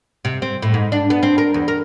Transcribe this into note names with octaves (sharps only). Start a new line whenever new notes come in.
C3
C4
A2
G#2
D4
B3
C4
A#4
E2
A#4